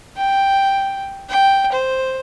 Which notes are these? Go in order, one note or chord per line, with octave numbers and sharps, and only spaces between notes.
G5
G5
C5